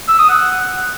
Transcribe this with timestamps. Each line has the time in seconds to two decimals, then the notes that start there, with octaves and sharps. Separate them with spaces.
0.08 E6
0.19 D#6
0.29 F#5